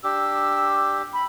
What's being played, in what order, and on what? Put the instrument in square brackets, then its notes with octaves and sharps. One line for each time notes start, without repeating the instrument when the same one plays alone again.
[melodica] D4 G4 [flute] E6
[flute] B5